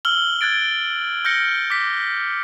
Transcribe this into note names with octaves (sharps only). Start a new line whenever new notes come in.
E6 F6 F#7 G7
F#6 G#6 A6 D7
F6 G6 A#6 C#7
D6 B6